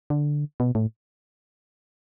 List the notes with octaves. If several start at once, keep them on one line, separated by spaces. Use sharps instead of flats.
D3
B2
A2